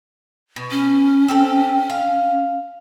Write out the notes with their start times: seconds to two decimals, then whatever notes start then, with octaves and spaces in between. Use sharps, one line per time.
0.56 B2
0.71 C#4
1.28 C4 G4 A4
1.90 F5